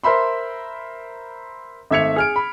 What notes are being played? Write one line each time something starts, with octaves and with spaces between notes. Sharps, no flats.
A#4 C5 E5 B5 C6
G#1 A3 E5 G#6 C#7 F7
G#4 F6 D7
B5